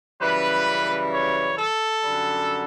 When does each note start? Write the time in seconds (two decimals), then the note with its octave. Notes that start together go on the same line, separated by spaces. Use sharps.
0.21 F#2 C#3 E3 G3 B4
1.12 C#5
1.57 A4
2.03 F#2 D3 G3